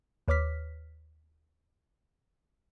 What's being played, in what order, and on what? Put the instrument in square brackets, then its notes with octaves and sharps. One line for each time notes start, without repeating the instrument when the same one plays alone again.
[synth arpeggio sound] D#2 B4 C#5 D6 F6 B6